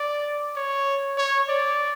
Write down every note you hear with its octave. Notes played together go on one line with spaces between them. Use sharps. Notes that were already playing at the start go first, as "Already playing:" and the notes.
Already playing: D5
C#5
C#5
D5